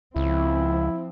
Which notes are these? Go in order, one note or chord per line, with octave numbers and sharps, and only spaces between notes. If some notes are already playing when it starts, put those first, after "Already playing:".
C#2 F3 C4 E4